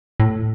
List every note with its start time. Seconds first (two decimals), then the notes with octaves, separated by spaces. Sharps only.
0.20 A2